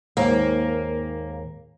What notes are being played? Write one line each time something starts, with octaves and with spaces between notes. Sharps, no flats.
D#2 G#2 A#3